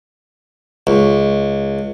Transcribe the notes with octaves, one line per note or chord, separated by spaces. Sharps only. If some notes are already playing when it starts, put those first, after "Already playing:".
C#2